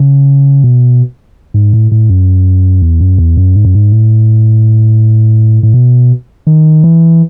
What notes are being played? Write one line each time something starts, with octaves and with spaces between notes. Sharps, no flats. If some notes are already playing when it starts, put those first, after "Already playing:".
Already playing: C#3
B2
G#2
A2
A2
F#2
E2
F#2
E2
F#2
G#2
F#2
G#2
A2
A2
B2
D#3
E3